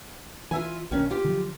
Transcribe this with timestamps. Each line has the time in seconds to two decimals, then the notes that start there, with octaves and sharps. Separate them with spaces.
0.51 E3 F4 E5 G#5
0.91 B1 D#3 A#3 C#4 D4
1.11 F4 G4
1.24 D3 F3 F#3